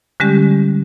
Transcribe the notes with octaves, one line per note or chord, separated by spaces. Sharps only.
D3 G3 G#3 C#4 G4